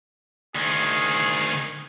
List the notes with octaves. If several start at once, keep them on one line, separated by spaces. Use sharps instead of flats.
D2 D#3 G#4